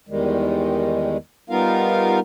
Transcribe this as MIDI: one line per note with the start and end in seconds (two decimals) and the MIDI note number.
0.09 1.17 40
0.09 1.17 51
0.09 1.17 55
0.09 1.17 56
1.50 2.20 55
1.50 2.20 59
1.50 2.20 63
1.50 2.20 65
1.50 2.20 70
1.50 2.20 77